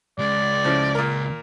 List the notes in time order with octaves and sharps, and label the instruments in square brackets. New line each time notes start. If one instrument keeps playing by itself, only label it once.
[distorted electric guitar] C#2 G#3 [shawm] D5
[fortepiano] A2 C#3 F3
A#2 A#4